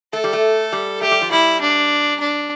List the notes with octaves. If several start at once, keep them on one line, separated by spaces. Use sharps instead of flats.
A3 A4
G3
A3
G3
A3 G4
G3
F3
G3 E4
D4
D4